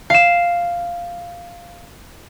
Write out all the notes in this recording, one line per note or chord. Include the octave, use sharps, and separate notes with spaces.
F5 E7